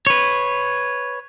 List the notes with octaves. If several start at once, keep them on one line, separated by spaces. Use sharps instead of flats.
B4 C#5